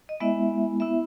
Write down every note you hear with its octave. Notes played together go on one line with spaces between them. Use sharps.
D#5
G#3 B3 E4 E5
B3 E4 E5